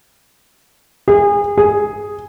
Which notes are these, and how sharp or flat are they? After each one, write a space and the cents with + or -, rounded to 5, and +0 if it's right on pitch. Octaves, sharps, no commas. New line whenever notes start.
G#4 -30
G#4 +0